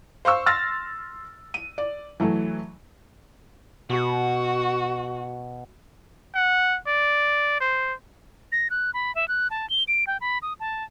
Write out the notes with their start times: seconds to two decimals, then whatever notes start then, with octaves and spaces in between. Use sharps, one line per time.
0.25 C5 F5 C#6 E6
0.46 C6 E6 F6 A6 A#6
1.54 D#7
1.78 D5
2.20 E3 F#3 A3
3.90 B2 F#4
6.35 F#5
6.87 D5
7.60 C5
8.52 A#6
8.70 F#6
8.94 B5
9.15 E5
9.28 F#6
9.50 A5
9.70 G7
9.88 D7
10.07 G5
10.21 B5
10.42 D#6
10.60 A5